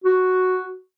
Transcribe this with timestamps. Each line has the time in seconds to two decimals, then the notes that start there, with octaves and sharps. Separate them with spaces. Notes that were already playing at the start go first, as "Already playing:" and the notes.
0.04 F#4